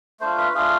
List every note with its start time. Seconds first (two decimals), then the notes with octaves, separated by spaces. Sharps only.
0.20 A3 D4 F4 C5
0.38 B4
0.54 A3 D4 F4 G#4